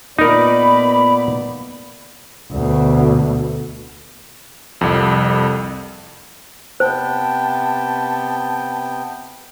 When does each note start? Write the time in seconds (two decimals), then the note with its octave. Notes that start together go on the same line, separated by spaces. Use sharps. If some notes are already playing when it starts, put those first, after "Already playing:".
0.19 A#2 B3 D#4 A#4 D5 B5
2.51 D2 B2
4.81 C2 F2
6.80 C3 B3 C5 G5 A5